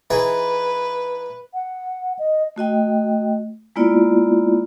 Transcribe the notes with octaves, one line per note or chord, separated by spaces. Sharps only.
E3 D#4 G#4 B4
F#5
D#5
A3 F#4 D#5 G5
G#3 A#3 B3 E4 F4 D5